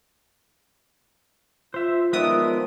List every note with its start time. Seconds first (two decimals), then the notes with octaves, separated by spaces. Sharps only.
1.74 F4 C5 E5
2.13 D#3 F3 G#3 B3 D5 E5 D#6